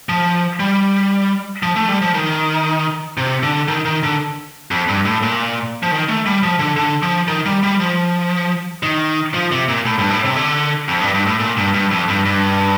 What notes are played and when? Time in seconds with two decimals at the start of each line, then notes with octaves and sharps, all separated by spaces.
0.09 F3
0.60 G3
1.63 F3
1.76 A3
1.88 G3
2.02 F3
2.14 D#3
3.17 C3
3.43 D3
3.68 D#3
3.85 D#3
4.03 D3
4.71 F2
4.88 G2
5.05 A2
5.22 A#2
5.83 F3
5.91 D#3
6.09 A3
6.26 G3
6.43 F3
6.59 D3
6.77 D3
7.03 F3
7.28 D#3
7.46 G3
7.63 G3
7.80 F3
8.83 D#3
9.34 F3
9.51 C3
9.68 A#2
9.85 A2
9.98 G2
10.10 A2
10.25 C3
10.36 D3
10.88 F2
11.01 G2
11.14 G2
11.26 A2
11.40 A#2
11.57 G2
11.74 G2
11.91 F2
12.08 G2
12.26 G2